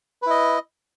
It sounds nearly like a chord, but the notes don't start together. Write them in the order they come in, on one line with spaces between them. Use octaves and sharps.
B4 E4 D#5